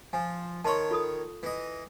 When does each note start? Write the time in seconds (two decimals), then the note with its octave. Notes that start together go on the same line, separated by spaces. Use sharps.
0.13 F3 G#5
0.65 D#3 C#5 A5 C6 C#6
0.91 F4 A4 D#6
1.43 E3 D#5